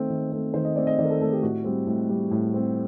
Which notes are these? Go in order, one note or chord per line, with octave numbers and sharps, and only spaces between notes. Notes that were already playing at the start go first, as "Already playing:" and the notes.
Already playing: D#3 A3 C4
D#3
A3 C4
D#3 C5
D#5
A3 C4 D5
D#5
D#3 D5
A#4
A4
A3 C4 A4
G4
A2 F#4
G3 C4
A2
G3 C4
A2
G3 C4